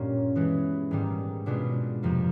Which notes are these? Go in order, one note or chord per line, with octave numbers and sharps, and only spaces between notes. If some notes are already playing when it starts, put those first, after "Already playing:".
Already playing: G2 A#2 G3 A#3 C#4 F4
E3 G#3 B3
G#2 D#3 G3
B2 G#3 B3 D4 F4
F2 C3 F3 A#3